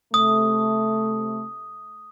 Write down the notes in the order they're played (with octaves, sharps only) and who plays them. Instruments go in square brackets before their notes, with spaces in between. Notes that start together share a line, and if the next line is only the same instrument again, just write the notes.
[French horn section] C3 A3 [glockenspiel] D#6